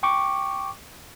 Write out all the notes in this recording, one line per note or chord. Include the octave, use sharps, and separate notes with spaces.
G5 C#6 D6